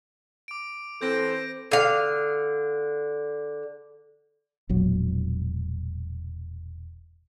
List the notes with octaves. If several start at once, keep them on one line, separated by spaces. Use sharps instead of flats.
D6 D7
E3 C4 A4 C5 G6 A#6 D7
D3 F5
E1 A#1 F#3